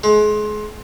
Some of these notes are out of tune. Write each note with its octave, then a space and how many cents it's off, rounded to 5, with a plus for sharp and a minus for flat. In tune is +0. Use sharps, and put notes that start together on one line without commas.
G#3 +30